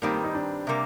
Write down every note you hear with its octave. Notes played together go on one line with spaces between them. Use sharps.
G2 D#3 G3 A#3 C4
A#3
D#4
D4
C3 G3 A#3